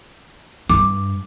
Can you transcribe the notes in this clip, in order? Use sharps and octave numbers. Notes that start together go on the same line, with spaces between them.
G2 D6